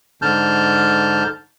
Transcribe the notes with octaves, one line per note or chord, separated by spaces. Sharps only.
G#2 D3 A5 F6 G6